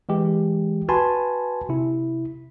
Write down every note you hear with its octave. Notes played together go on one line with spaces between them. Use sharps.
E3 G#3 G4
F#4 B4 G#5 A5 B5 C6
C3 E4